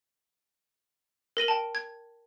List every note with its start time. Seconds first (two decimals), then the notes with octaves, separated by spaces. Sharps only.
1.37 A#4 A#6 D#7 F#7
1.48 G5 A5
1.75 G#6